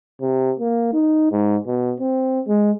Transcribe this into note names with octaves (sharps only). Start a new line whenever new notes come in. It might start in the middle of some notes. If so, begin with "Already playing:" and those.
C3
A#3
D#4
G#2
B2
C4
G#3